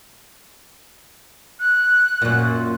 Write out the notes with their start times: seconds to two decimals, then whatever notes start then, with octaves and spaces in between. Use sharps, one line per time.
1.60 F#6
2.22 F#2 A#2